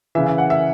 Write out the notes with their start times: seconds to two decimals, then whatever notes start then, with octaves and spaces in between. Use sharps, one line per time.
0.15 C#3 E3 E5
0.27 E5
0.38 F#5
0.50 E5